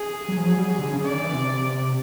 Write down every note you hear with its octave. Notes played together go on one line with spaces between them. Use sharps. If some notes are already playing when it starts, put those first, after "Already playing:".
Already playing: G#4
F#3
F3
F#3
G3
F#3
D3
C#3
D3 D5
D#3
E3
C3